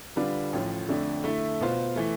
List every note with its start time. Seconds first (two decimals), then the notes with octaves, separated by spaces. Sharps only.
0.16 D3 G3 D4 F4 B4
0.53 A1 A2 F3
0.88 F2 D3 A3 D4
1.24 D3 A3 E4
1.60 B2 B3 F4 C5
1.96 E3 A3